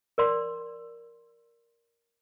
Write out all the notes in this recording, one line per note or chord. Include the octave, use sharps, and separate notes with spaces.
A#4 D5 C6